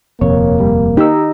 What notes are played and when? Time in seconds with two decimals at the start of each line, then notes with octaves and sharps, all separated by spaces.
0.21 D#1 F2 C3 A#3 C#5
0.60 G3
0.97 D#4 G4 E6